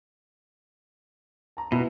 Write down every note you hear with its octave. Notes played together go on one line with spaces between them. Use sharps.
A5 A#5
B2 B3 E4